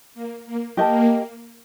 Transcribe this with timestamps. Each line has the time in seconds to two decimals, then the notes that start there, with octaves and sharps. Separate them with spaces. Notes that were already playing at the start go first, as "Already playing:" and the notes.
0.14 A#3
0.46 A#3
0.77 A#3 G4 A#4 D#5 A5